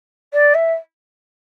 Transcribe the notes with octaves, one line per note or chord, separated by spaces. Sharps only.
D5
E5